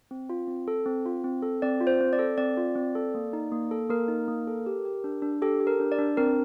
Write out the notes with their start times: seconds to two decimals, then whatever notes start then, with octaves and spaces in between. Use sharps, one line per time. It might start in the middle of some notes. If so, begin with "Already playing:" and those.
0.11 C4
0.30 F4
0.48 C4
0.68 A4
0.86 C4
1.06 F4
1.24 C4
1.43 A4
1.62 C4 D5
1.80 F4
1.87 C5
2.00 C4
2.13 D5
2.19 A4
2.38 C4 D5
2.57 F4
2.76 C4
2.95 A4
3.15 A#3
3.33 D#4
3.52 A#3
3.71 A4
3.90 A#3 A#4
4.08 D#4
4.28 A#3
4.47 A4
4.66 G4
4.85 G4
5.04 D4
5.22 D4
5.42 G4 A4
5.60 G4
5.67 A#4
5.80 D4
5.92 D5
5.99 D4
6.17 C4 A#4